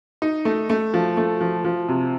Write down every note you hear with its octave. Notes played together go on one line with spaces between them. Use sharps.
D#4
A3
A3
F3
A3
F3
F3
C3